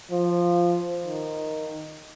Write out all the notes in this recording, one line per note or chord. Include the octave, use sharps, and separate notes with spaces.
F3
D#3